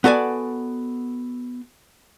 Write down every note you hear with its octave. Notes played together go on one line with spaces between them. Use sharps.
B3 F#4 A4 D5 G#5